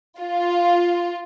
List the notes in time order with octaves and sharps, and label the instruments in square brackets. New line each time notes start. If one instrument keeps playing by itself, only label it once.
[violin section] F4